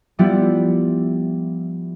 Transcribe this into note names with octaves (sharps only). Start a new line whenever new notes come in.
F3 G3 B3 E4